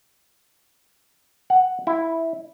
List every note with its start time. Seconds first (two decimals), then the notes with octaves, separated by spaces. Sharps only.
1.50 F#5
1.87 E4